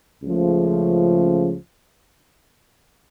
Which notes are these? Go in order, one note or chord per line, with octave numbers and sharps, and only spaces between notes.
C#2 C#3 F3 A3